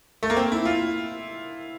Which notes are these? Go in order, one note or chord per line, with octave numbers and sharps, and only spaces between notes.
A3
A#3
C4
E4
F4